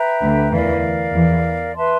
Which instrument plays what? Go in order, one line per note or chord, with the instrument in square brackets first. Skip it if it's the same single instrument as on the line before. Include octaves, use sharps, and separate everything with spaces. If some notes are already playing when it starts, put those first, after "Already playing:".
Already playing: [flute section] B4 E5 G5 A#5
[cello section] D2 D3
[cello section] E2 E3 [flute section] A#4 D5 F5
[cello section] E2 E3
[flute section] B4 E5 A5 C6